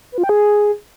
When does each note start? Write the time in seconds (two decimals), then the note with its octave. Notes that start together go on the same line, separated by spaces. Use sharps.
0.12 B4
0.18 F4
0.24 G5
0.29 G#4